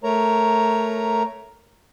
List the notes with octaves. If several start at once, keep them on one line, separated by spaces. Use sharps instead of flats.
A3 A#4 C#5 A#5